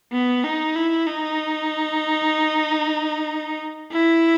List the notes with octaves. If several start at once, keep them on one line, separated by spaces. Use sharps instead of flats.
B3
D#4
E4
D#4
E4